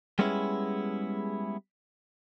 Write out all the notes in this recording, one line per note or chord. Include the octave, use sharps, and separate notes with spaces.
G3 G#3 B3 C#4 E4 G#4